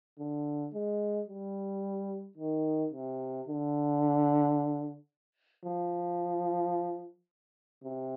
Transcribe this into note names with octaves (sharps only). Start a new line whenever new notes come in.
D3
G#3
G3
D#3
C3
D3
F3
C3